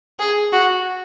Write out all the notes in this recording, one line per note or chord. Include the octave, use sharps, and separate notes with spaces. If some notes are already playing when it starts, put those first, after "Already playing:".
G#4
F#4